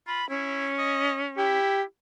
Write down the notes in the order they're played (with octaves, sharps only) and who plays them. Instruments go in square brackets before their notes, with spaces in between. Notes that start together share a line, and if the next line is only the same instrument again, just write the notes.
[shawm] F4 [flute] B5
[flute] C#4 [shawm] E4
[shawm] D#5
[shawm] E4 [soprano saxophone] G4